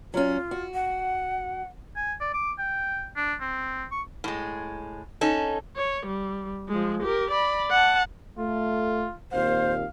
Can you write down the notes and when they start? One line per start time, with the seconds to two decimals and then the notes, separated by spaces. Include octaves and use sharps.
0.14 F#3 C#4 F4
0.51 F#4
0.74 F#5
1.96 G#5
2.21 D5
2.33 D6
2.58 G5
3.16 D4
3.41 C4
3.91 C#6
4.24 A2 G#3
5.21 C#4 D#4 A4
5.76 C#5
6.06 G3
6.68 F3 G#3
7.02 G4 A#4
7.31 D5 B5
7.71 F#5 A5
8.37 A3 F4
9.32 D#2 A#2 C4 C5 F5